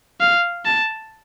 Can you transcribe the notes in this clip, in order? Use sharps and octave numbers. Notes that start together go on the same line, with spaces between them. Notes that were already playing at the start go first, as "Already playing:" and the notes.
F5
A5